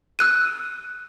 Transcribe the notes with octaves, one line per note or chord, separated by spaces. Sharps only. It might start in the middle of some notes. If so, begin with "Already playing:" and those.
E6 F#6 D#7